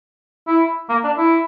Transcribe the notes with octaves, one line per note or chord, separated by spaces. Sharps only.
E4
A#3
D4
E4